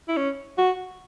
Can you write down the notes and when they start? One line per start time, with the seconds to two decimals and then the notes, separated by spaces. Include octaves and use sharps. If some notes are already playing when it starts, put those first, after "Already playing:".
0.08 E4
0.17 C#4
0.58 F#4